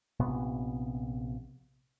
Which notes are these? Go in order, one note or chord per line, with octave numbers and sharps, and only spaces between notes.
A#1 C3 B3